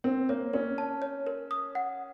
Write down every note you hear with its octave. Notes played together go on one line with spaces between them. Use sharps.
C4 A#4
A#3 C#5
C#4 A#4
A5
C#5
A#4
D#6
F#5